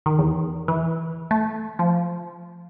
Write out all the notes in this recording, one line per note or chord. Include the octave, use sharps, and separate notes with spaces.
D#3
E2
E3
A3
F3